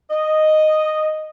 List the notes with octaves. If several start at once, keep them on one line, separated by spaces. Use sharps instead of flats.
D#5